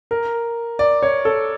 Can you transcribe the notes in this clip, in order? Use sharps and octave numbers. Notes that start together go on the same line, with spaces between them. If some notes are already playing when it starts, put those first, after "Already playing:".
A#4
D5
C#5
A4